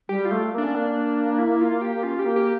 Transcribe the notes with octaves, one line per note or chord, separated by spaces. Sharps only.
G3 G4
F4
A3
A#3
D4
C#4
A#3
E4
F4
G4
C#4 F4
G4
A#3
G4